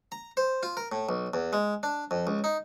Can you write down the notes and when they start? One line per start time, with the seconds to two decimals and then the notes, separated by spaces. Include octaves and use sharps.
0.12 A#5
0.37 C5
0.63 F4
0.77 A#4
0.92 A2
1.09 B1
1.34 E2
1.53 G#3
1.83 D4
2.11 F2
2.27 C#2
2.44 D#4